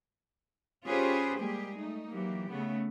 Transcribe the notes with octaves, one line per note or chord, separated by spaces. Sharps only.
C#4 F4 G4 G#4 B4 C5
G3 G#3 A#3 G4 G#4
A3 D#4
E3 F#3 A#3 G4
C#3 A3 B3